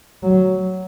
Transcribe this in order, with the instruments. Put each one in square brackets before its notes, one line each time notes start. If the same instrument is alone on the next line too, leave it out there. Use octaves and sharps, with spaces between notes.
[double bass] F#3